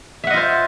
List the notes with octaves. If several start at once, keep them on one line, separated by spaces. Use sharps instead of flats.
F4 C5 D#5 E5 F#5